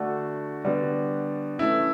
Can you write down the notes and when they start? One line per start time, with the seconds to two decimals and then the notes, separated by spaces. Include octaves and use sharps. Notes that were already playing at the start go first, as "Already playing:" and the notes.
Already playing: D3 A3 D4 F#4
0.65 D3 G3 B3 D4
1.59 E3 A3 C#4 E4